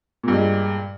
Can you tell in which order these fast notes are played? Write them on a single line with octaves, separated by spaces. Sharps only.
A#2 G2 G#3